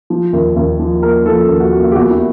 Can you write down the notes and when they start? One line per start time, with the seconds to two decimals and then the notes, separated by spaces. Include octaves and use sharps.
0.10 F3
0.33 D#2
0.56 D#2
0.79 F3
1.03 A#3 A#4
1.26 F3 A4
1.49 D#2
1.60 F#4
1.72 A#3 F#4
1.84 F4
1.91 G4
1.95 E2 F#4
2.11 E4